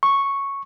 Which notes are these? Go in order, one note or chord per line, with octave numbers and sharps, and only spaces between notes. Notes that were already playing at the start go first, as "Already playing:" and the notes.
C#6